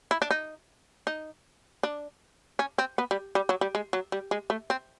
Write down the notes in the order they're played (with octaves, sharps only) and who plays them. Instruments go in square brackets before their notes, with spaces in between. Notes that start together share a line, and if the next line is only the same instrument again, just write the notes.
[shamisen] E4
D4
D#4
D#4
D4
C#4
C4
B3
G3
G3
F#3
G3
G#3
F#3
G3
G#3
A3
C4